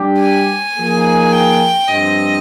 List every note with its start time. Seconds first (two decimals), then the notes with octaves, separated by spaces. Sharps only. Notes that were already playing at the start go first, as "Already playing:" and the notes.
Already playing: G3 D4 G4
0.19 G#5
0.76 F3 A#3 D#4 G#4
1.32 G5
1.88 G2 F3 C4 D#5